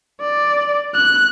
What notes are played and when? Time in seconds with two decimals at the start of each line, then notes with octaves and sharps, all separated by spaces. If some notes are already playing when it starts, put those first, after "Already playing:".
0.21 D5
0.94 F#6